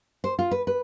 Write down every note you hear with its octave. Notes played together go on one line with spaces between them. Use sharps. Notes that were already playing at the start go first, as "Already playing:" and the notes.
C5
F4
B4
B4